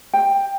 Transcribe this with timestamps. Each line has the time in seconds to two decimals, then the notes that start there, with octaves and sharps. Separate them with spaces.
0.13 G5